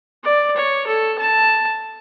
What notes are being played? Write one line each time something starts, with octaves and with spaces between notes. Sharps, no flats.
D5
C#5
A4
A5